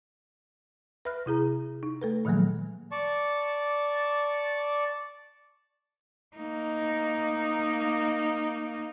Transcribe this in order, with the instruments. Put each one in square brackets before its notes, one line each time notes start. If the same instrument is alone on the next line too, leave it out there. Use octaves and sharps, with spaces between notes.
[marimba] B4 E5 B5 F6 F#6
C3 E4 G#4 A#5
D#4
A3 A4 B4
A#2 D#3 F3 F#3 G#3 A#3
[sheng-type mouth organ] D5 A5 C#6
[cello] A#3 D#4